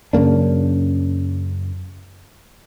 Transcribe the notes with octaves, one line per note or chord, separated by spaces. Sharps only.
F#2 C#3 A#3 D4